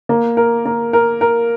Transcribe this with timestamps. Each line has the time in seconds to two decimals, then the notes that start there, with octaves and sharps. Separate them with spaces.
0.09 A#3
0.37 A#4
0.66 A#3
0.93 A#4
1.21 A#4